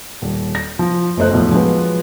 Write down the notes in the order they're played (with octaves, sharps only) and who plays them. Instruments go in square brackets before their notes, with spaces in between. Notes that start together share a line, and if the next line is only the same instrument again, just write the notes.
[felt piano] D#1
A#6
F3
F#1 D2 A3 C5 D#5 F#6
B1 E2 A2 F3
F3 F#3 G#3 B3